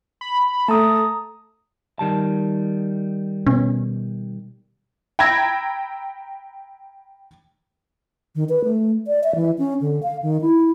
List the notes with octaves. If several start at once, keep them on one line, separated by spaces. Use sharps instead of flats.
B5
A3 A4 A5 A#5 D#6
D#3 G3 A5
B2 C#4
G5 A#5 B5 E6 G#6 A#6
D#3
B4
A3
D5
E5
E3
C#4
D3
F5
D#3
E4